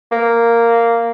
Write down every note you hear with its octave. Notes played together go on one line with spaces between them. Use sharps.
A#3